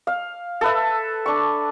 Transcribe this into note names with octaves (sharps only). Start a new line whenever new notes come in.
F5
A4 B4 E5
D4 C#6